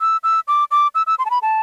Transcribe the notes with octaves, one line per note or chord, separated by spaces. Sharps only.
E6
E6
D6
D6
E6
E6
C6
A5
B5
A5